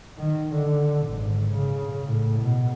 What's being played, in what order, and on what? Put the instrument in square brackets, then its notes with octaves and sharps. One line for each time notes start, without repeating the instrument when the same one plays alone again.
[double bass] D#3
D3
G#1
C#3
A2
B2